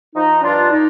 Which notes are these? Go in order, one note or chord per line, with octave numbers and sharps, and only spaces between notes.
F3 D#4
G2 D4 F4
D#4